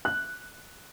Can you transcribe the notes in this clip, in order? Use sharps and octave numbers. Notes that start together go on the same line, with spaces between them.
F#6